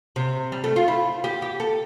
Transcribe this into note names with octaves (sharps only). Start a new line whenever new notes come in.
C3
G3
A3
F4
E4
G4
G4
A4